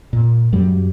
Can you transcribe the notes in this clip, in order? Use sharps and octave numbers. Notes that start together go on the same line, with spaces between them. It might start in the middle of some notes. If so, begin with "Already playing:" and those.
A#2
F#2 F#3 G3